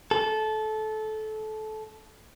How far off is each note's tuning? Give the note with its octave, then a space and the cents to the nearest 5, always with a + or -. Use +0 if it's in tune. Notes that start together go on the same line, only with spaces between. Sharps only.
A4 -20